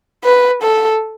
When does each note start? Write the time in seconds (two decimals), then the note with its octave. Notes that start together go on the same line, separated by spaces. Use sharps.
0.24 B4
0.62 A4